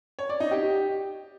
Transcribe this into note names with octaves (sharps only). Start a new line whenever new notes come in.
C#5
D5
D#4
G4